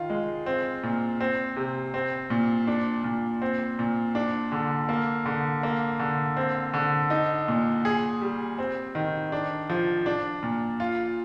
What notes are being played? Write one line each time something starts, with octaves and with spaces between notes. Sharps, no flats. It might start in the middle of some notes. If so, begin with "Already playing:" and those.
Already playing: D#3 F4
G#3
C4
A#2
C4
C3
C4
A#2
D4
A#2
C4
A#2
D4
D3
A#3
D3
A#3
D3
C4
D3
D#4
A#2
G#4
G3
C4
D#3
D4
F3
D4
A#2
F4